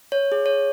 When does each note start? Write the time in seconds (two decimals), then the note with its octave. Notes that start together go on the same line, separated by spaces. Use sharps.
0.12 C#5
0.32 G#4
0.46 C#5